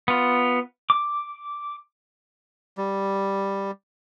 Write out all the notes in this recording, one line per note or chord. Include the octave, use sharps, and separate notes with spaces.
B3 F4
D6
G3